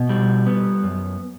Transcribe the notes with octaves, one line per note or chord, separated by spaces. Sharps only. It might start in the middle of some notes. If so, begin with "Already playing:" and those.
Already playing: B2
G3
B3
F#2